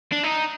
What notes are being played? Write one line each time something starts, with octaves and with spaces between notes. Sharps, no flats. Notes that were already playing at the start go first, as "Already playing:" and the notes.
D4
D#4